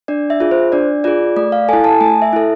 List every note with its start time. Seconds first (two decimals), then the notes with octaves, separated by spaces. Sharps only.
0.08 D4 D5
0.30 E5
0.40 F4 G#4
0.51 C5
0.72 D4 D5
1.04 F4 G#4 D5
1.36 A3 D5
1.52 F5
1.69 E4 A4 G#5
1.84 A5
2.00 A3 G#5
2.22 E5
2.33 E4 A4